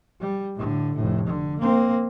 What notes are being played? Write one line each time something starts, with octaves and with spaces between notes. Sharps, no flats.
G3
A2 D3
F1 A2
D3
A#3 C4